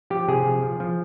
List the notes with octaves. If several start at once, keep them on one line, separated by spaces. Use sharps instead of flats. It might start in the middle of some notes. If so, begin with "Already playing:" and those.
F3 G4
C3 G#4
F3
F3
F3